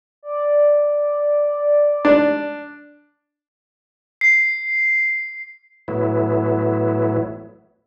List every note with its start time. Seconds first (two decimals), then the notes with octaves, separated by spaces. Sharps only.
0.23 D5
2.05 D4
4.21 C7
5.88 A2 E3 F#3 A3 B3 E4